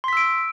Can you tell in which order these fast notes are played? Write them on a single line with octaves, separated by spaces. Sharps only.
C6 B6 E6 D7